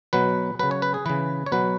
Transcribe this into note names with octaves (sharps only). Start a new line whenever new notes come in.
B2 F#3 B4
C#3 F#3 B4
C#5
B4
G#4
C#3 E3 B4
C#5
B2 F#3 B4